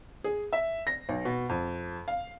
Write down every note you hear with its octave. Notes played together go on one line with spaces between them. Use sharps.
G#4
E5
A#6
B1
B2
F2
F5